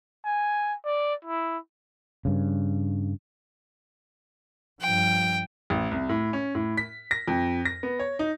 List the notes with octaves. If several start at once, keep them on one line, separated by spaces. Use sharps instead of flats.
G#5
D5
E4
G2 C#3
G2 F3 G5
A1
C2
A2
C#4
A2
B6
A#6
F2
A#6
B3
C#5
D#4